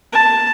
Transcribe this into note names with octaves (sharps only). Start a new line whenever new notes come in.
A5